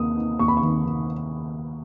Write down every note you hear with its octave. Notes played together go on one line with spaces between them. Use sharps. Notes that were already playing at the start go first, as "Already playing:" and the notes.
Already playing: D#2 A#3 D#4 D#6
D#4
D#2 C#6
B5
C#6
D#3
D#3